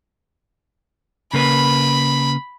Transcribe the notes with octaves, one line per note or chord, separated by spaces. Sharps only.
C#3 A#3 B4 B5